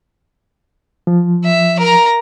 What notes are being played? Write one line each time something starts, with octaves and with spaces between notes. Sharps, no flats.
F3
E5
A#4 A#5